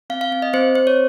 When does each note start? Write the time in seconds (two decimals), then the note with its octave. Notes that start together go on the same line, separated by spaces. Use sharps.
0.10 C4 F5
0.21 F5
0.31 C4 F5
0.42 D#5
0.53 C4 C5
0.75 C4 C5
0.87 C#5